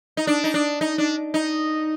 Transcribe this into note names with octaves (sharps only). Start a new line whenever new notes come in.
D#4
D4
D#4
D4
D#4
D4
D#4